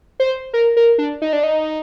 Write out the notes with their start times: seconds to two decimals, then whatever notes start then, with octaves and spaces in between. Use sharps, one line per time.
0.20 C5
0.53 A#4
0.77 A#4
0.98 D4
1.22 D#4
1.33 D4
1.43 D#4